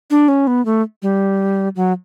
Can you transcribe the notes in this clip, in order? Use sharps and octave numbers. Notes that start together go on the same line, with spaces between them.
D4
C#4
B3
A3
G3
F#3